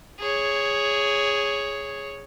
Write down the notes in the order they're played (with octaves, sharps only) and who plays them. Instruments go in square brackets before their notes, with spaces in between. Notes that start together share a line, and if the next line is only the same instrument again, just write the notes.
[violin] G#4 C#5